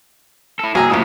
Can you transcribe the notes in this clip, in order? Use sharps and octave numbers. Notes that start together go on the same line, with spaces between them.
E4 A4
C2 A#3 F#4 G#4 G5 A#5 E6
C2 F2 A2 G4 D#6